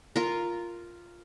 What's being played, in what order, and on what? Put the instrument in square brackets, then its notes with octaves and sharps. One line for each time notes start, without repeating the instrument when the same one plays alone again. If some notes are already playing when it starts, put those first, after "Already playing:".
[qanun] F4 A#4